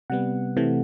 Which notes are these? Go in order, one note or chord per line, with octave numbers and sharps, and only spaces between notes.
C3 G3 B3 F#5
C3 E3 A3